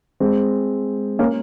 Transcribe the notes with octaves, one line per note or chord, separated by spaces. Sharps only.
G#3 C4
A#3 C#4